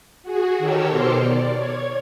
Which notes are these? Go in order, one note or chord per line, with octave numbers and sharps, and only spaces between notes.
F#4 G#4
D#3 G4 A4 A#4 C#5 E6
B2 C5 C6 D6 F6 C#7
D5
C#5 G#6